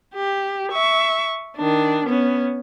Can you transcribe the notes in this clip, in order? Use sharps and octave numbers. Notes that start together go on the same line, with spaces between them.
G4
E5 C#6
D#3 D4
B3 C#4